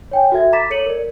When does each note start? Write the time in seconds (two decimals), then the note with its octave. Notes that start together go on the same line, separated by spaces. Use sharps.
0.11 C#5 G5 G#5
0.32 F#4 A4 E5 G#6
0.53 A#5 B5 D6 A6 B6 E7
0.70 A4 C#5 C#7 D#7 F#7
0.86 A#4 D5